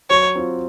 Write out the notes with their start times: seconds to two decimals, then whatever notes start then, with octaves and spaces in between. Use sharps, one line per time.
0.10 F#3 C#5
0.35 C4 F4